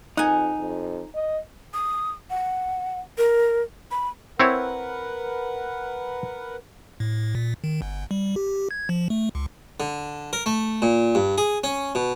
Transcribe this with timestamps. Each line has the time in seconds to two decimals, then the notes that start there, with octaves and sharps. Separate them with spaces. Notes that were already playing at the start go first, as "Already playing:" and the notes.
0.17 F2 D#4 F#5 G#5
0.59 F2
1.14 D#5
1.74 D#6
2.30 F#5
3.18 A#4
3.91 B5
4.40 C4 E4 A#4 B4 C#5 F#5
7.00 A2
7.35 A#2
7.64 D#3
7.82 G1
8.11 G3
8.36 G4
8.71 G#6
8.89 F3
9.10 A3
9.35 C#2
9.80 D3
10.33 A#4
10.46 A3
10.82 A#2
11.15 G2
11.38 G#4
11.64 C#4
11.95 B2